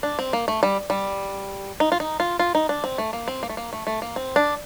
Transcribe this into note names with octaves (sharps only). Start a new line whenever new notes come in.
D4
C4
A#3
A3
G3
G3
D#4
F4
D#4
F4
F4
D#4
D4
C4
A3
A#3
C4
A#3
A3
A#3
A3
A3
A#3
C4
D4